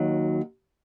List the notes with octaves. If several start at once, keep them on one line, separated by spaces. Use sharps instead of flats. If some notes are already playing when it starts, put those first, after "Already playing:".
Already playing: D#2 D#3 F#3